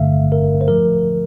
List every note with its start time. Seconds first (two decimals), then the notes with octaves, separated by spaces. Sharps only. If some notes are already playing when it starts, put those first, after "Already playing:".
Already playing: G1 G2 D3 A3 E5 F5
0.32 A#4
0.61 C5
0.68 F3 A3 A#4